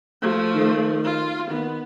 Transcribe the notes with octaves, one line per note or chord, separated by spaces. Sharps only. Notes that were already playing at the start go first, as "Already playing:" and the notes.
F3 A3
D#3
F4
D#3 B3